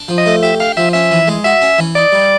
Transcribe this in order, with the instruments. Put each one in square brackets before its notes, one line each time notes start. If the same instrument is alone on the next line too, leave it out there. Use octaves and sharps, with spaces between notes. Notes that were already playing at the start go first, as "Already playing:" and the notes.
Already playing: [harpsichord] D4
F3
[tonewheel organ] D#5
[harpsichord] A3
[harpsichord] G4 [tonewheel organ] E5
[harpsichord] D4 [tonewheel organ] F5
[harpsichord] F3 [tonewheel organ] E5
[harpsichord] C#4 [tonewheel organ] E5
[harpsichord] E3
G#3
[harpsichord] F#4 [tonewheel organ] E5
[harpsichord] C#4
E3
[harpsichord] D#4 [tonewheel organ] D5
[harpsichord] G3